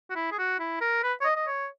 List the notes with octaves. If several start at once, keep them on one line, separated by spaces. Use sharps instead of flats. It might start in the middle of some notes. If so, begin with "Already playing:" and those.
F#4
E4
G#4
F#4
E4
A#4
B4
C#5
D#5
D#5
C#5